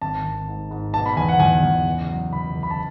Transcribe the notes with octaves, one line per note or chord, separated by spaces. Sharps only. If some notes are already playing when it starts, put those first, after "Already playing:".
G#1 A5
G#1
G#2
G#2
B2 A5
B5
E2 G#5
F#5
E2 G#5
E2
C#2
F#3
C#2 B5
C#2
B5
A5